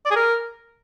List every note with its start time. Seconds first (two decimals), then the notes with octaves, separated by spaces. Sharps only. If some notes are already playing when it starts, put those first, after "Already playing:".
0.06 D5
0.11 G#4
0.16 A#4